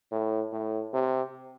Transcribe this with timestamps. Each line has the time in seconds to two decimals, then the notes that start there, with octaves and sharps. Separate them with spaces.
0.12 A2
0.53 A2
0.94 C3